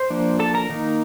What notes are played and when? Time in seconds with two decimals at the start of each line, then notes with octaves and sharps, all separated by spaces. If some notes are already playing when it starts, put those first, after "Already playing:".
Already playing: C5 C6
0.10 F3 A#3 D4
0.40 A4 A5
0.54 A#4 A#5
0.70 D#3 A#3 D#4